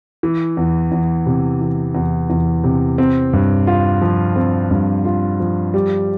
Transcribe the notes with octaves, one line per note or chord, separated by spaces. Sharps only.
E3
E2
E2
C3
E3
E2
E2
C3
C4
G2
F4
F3
C4
G2
F4
F3
G3